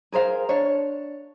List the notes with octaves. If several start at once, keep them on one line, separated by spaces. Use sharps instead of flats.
G#4 A#4 C5 F5
D4 C#5